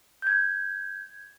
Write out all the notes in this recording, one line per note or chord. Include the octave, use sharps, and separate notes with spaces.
G6 G#6